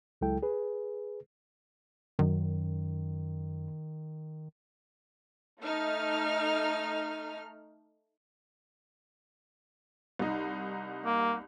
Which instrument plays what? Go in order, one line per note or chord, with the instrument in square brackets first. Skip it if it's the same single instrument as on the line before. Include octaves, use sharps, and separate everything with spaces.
[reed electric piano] C#2 F#3 G#3 E4 A4 G5
G#4 B4
[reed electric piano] F#2 [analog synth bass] D#3
[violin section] A3 D#4 F6
[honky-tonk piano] C2 D#4
[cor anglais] A#3